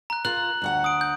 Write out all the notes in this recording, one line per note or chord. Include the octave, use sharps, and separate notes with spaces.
A#5 F#6
F4 A#4 F#6 F#7
D2 F#4 F#5
D#6 D7
G6